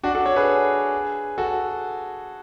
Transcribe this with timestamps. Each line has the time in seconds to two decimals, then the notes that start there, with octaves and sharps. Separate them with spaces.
0.03 D4 F#4
0.15 F#4 A4
0.26 A4 C#5
0.36 G#4 B4
1.38 F#4 A4